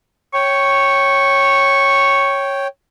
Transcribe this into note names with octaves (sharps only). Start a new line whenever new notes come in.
C#5 G5 C#6